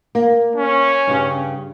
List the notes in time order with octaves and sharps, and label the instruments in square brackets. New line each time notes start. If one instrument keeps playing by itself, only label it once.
[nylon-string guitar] A#3
[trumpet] C#4
[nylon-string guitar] G2 C#3 G3